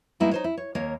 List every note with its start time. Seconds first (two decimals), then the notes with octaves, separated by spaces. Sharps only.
0.20 G3 G#3 A#3 B3 D#4 E4
0.32 D#4 C5 C#5
0.44 E4
0.57 C#5
0.75 D#2 A#3 C#5